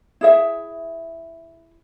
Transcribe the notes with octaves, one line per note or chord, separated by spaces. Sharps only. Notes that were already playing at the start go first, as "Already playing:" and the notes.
E4 G#4 E5